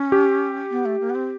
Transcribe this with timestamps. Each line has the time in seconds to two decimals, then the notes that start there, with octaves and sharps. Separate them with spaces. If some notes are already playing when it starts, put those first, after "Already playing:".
Already playing: C#4
0.12 G4
0.71 B3
0.85 A3
1.00 A#3
1.10 B3
1.15 C4